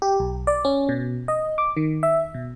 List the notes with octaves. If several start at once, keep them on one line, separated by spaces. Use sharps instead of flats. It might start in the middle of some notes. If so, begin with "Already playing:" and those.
G4
B1
D5
C#4
B2
D#5
D6
D#3
E5
B2